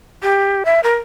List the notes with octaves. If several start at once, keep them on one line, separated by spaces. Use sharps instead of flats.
G4
E5
A#4